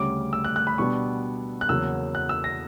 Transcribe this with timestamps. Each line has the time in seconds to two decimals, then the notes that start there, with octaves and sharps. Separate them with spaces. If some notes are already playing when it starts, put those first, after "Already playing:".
Already playing: D2 C#3 G3 C#4 D6
0.33 E6
0.44 F#6
0.56 F#6
0.67 B5
0.78 B2 G3 B3 D4 C#6
1.61 F#6
1.69 E2 C#3 F#3 A#3 E6
2.15 F#6
2.29 E6
2.44 A#6